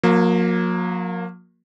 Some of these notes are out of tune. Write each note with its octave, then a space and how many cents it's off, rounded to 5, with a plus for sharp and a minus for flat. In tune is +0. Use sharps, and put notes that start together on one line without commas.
F#3 -45 A#3 +0